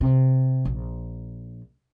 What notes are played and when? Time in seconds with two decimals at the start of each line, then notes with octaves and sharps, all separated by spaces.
0.01 C3
0.65 A#1